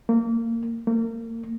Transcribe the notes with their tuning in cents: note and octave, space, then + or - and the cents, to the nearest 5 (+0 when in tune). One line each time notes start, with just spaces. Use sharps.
A#3 -25
A#3 -35